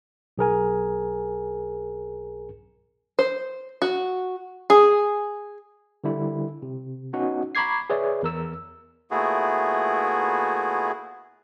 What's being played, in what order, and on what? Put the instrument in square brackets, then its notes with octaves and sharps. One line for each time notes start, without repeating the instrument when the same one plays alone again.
[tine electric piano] B1 G#4 A#4 G#5
[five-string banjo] C5
F#4
G#4
[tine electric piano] D3 G3 E4
C3
B3 C#4 D#4 F#4 D#5 F#5
A#5 B5 C#6 D6 G#6 C7
G#4 B4 C#5 D5 E5
E2 A#4 E6
[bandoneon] A#2 A3 B3 E4 F#4 G#4